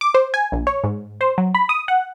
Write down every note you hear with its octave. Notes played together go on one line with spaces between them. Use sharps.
D6
C5
G#5
A#1
C#5
G#2
C5
F#3
B5
D#6
F#5